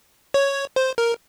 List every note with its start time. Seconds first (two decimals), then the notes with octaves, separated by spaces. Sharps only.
0.34 C#5
0.76 C5
0.98 A#4